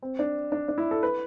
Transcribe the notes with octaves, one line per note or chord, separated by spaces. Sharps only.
C4
D4
D4
D4
E4
A4
B4